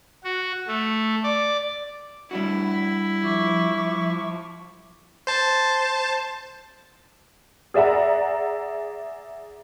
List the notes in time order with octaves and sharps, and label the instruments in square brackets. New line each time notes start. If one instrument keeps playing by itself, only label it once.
[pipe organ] F#4
A3
D5
[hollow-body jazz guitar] G3 D4 F#4 [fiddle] E4
[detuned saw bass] F3 [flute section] E5 C#6 D6
[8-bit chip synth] C5 A5
[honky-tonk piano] G#4 D5 E5 F#5 A#5